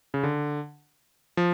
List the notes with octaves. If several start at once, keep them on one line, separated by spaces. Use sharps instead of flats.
C#3
D3
F3